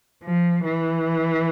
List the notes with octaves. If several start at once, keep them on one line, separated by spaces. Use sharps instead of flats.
F3
E3